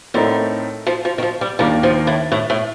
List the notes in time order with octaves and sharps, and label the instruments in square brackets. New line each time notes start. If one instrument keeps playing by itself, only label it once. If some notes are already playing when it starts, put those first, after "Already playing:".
[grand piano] A2 A3 C4 D#4 A#4 [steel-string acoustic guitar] D3
[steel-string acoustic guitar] F3
F3
D#3
F3
G3
[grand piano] D#2 D#3 A#3 D4 [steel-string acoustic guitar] G3
[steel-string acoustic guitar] F3
A2
A2
A2